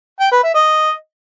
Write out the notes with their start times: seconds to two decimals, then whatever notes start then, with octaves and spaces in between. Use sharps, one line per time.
0.20 G5
0.32 B4
0.43 E5
0.55 D#5